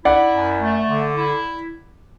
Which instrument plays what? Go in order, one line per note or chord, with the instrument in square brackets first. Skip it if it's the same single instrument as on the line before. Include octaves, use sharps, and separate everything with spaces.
[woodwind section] E4 [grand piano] D5 F#5
[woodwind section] F#2
A3
D3
E4